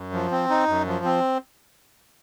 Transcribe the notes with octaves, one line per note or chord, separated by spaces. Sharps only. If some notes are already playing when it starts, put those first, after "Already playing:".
Already playing: F#2
F3
C4
D#4
F#2
F3
C4